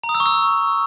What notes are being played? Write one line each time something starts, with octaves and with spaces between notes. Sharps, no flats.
A#5
D#6
E6
C#6
E6